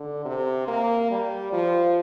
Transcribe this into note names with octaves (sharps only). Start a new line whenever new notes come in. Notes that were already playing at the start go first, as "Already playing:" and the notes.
Already playing: D3
C3
A#3
G3
F3